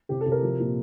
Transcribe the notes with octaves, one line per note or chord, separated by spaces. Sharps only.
C3 G4
A4
C3
A#4
F3
A#2